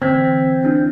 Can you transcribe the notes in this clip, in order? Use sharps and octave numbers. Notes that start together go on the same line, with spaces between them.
D3 E3 C4 E6 G#6 B6
D4 E4 G6